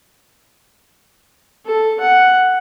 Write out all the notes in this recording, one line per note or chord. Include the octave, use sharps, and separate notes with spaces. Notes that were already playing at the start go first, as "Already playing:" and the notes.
A4
F#5